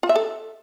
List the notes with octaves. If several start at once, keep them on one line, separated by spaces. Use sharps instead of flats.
F4
E5
A4